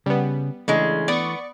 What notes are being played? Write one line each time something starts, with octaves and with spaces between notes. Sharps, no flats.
C#3 G3 B3
C#3 E3 G#3 A3 D4
B3 D5 C#6